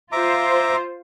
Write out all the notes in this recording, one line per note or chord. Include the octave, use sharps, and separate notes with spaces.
F4 C5 E5 A#5 D6